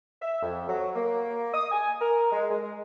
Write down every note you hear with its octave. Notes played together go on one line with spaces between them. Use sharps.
E5
F2
F#3
A#3
D#6
G#5
A#4
G#3
G#3